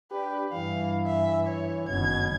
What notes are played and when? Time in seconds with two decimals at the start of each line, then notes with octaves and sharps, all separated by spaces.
0.12 D4 G4 B4
0.53 G2 E3 F5
1.06 E5
1.47 C#5
1.89 F#1 G2 B2 D#3 B3 C#4 G#6